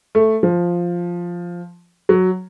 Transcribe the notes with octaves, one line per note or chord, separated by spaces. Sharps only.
A3
F3
F#3